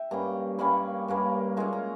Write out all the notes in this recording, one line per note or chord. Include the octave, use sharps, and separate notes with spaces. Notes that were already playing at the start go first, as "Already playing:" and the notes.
Already playing: E5 G5
G2 G3 A#3 C#4 A#5
G2 G3 A#3 C#4 B5
G2 G3 A#3 C#4
A#2 G#3 C#4 A#5
A#5